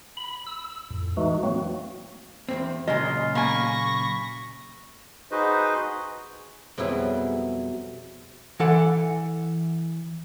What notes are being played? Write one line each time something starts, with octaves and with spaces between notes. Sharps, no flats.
B5
E6
F2 A2
E3 G#3 A3 D#4 F#4
F#3 A#3 C4 F#4
E2 G2 C4
A#2 C#3 F#3 G#3 F4 D#5
A#3 G#5 B5 C#6 A#6
D#4 F#4 G#4 B4 C5 D#5
F2 B2 F#3 G3 E4 G#4
E3 A4 F#5